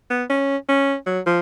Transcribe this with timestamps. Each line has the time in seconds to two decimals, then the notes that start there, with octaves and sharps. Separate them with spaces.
0.10 B3
0.30 C#4
0.69 C#4
1.06 F#3
1.27 F3